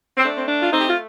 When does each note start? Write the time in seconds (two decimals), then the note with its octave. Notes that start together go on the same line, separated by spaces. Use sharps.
0.17 C4
0.24 A3 D4
0.36 C4
0.47 D4
0.61 F4
0.71 A3 C4 D#4
0.79 G4
0.88 F4